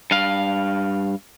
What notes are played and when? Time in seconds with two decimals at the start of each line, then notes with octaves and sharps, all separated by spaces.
0.11 G2 F5